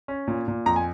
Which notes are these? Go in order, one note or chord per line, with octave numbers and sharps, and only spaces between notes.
C#4
A#2
A#2
F2 A#5
G#5